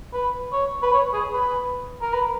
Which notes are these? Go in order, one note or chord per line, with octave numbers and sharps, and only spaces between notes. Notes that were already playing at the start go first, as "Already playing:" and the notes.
B4
C#5
B4
C#5
G#4
B4
A#4
B4